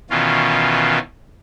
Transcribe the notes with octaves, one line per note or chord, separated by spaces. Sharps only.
B2 D#3 E3 C#4 F4